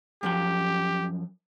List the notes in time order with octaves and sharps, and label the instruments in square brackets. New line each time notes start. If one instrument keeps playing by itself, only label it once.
[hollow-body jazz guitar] F#2 F3 G5 [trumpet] G4